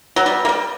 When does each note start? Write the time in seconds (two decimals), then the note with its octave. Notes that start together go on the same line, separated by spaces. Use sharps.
0.16 F#3
0.26 G3
0.45 A#3
0.49 G3